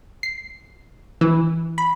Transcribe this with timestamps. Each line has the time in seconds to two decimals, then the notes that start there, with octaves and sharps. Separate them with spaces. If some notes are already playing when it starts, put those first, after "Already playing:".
0.23 C7
1.21 E3
1.78 B5